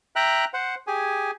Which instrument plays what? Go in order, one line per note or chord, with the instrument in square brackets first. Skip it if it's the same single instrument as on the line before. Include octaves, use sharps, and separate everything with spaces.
[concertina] E5 G5 A#5 F#6
C5 F#5
G4 G#4 G#5